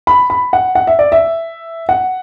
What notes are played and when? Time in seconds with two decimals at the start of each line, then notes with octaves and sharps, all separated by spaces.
0.07 B5
0.30 B5
0.53 F#5
0.75 F#5
0.87 E5
0.99 D5
1.12 E5
1.89 F#5